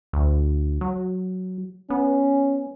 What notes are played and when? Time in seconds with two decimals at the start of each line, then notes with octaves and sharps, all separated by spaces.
0.13 D2
0.81 F#3
1.90 B3 C#4